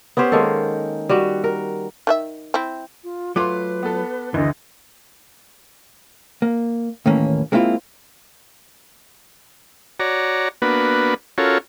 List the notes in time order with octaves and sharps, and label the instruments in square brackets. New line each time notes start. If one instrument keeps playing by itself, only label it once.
[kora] B3 C#4 G4 C5
D#3 G#3 A#3 A4
G3 F#4
A#4
[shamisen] D#3 F#4 E5
C4 E4
[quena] F4
[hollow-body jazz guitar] F#3 A3 F4 [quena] B4 [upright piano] C6 D6
[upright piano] B3 A4
[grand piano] D2 D3 [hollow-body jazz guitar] E3 [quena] D#5
[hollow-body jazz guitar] A#3
D#2 A2 E3 A#3 C#4
G#3 A#3 C4 E4 F4
[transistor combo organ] F#4 C#5 D5 A#5
A#3 B3 D4 F#4 B4
C#4 F4 F#4 A4 A#4 C#5